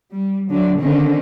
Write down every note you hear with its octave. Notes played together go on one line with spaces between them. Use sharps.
G3
D3 F#3 D4
D3 D#3 C4 C#4